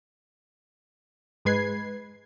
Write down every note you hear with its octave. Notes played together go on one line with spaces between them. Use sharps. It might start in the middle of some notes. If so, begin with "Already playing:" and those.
G#2 G#3 B4 G#6 C7